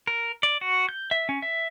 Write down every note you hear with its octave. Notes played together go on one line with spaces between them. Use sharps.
A#4
D5
F#4
G6
E5
C#4
E5